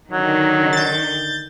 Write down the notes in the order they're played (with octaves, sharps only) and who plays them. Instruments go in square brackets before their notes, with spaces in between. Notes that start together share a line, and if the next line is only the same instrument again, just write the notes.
[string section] D3 D#3 [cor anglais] F#3
[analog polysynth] G6 A6